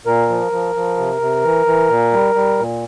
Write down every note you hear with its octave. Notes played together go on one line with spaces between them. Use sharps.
A#2 A#4
F3
F3
F3
C3
C3
E3
E3
A#2
G3
G3
A#2